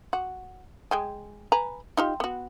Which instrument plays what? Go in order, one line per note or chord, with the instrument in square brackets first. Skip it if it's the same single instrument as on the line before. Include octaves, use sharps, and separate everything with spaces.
[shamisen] F#4
G#3 G5 G#5
B4 G#5 A#5
D#4 F4 G4
B3 F#4